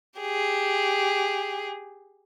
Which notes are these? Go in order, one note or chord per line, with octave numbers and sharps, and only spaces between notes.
G4 G#4